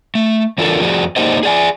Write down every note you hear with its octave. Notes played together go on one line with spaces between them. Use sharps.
A3
E3 D4 F4 A4 A#4
F2 F3 F#4 G#4 D5
A#3 D#4 G4 C5 D5 D#5
G#4 D5 G#5